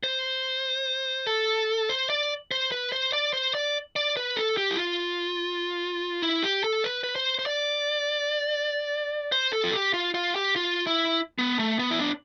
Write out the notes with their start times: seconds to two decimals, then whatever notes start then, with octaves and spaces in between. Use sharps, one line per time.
0.04 C5
1.27 A4
1.89 C5
2.10 D5
2.51 C5
2.72 B4
2.92 C5
3.13 D5
3.34 C5
3.55 D5
3.96 D5
4.17 B4
4.36 A4
4.57 G4
4.70 E4
4.78 F4
6.22 E4
6.43 G4
6.64 A4
6.84 B4
7.04 B4
7.16 C5
7.39 C5
7.46 D5
9.32 C5
9.53 A4
9.64 F4
9.73 G4
9.94 F4
10.14 F4
10.36 G4
10.56 F4
10.87 E4
11.39 B3
11.59 A3
11.79 B3
11.91 E4
12.00 D4